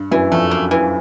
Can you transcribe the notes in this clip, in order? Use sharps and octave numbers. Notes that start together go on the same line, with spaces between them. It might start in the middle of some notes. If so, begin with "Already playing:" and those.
Already playing: G2
F#2 E3
F2 A3
A#3
E3